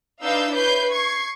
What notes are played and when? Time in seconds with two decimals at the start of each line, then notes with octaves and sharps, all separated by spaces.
0.23 D4 D#4 B4 F5 E6 G6
0.53 E4 B4 C#5 G6 C7
0.92 C#6 G#6 C7